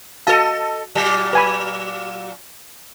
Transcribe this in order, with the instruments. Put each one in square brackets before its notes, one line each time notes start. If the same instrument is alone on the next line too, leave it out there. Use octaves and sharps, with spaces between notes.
[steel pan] F#4 F5 A5 [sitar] A4 D#5
[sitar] A#2 F#3
[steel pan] B4 G#5 B5